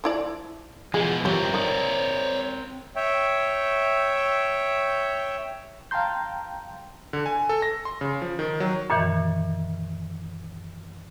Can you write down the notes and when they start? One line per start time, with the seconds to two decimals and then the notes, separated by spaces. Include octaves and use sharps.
0.04 F3 E4 D5
0.94 B2 E3 F3 G#3 G#4
1.25 G2 C4 F4 G4 A#4 C#5
1.54 D#3 C#5 D5
2.96 C#5 E5 G5
5.91 F5 G5 A5 A#5 C6 G6
7.13 D3
7.26 G#5
7.49 A4
7.62 A#6
7.85 C6
8.01 C#3
8.22 F3
8.39 D#3
8.60 F#3
8.90 F#2 A#2 D#3 E3